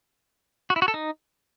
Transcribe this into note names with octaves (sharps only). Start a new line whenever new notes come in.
F#4
E4
F#4
A4
D#4